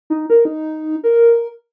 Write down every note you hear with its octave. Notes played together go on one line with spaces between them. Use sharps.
D#4
A#4
D#4
A#4